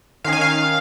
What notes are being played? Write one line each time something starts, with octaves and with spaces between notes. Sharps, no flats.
D#3 C#4 F5
G#5
F5